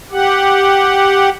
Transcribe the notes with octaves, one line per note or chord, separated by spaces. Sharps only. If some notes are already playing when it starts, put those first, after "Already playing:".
G4 F#5